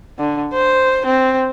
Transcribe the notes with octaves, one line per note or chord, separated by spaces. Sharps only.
D3
C5
C4